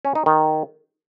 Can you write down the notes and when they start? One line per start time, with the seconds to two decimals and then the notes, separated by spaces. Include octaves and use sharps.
0.05 C#4
0.15 D#4
0.26 D#3